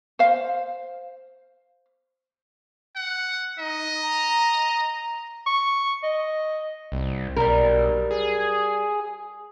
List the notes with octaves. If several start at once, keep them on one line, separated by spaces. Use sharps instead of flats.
C5 F5
F#5
D#4 D#5
A#5
C#6
D#5
C2
B1 G3 A#4
G#4